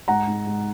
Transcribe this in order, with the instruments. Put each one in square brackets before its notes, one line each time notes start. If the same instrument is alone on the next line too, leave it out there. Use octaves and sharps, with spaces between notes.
[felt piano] G#2 [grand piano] F#5 A#5
[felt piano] G#2
G#2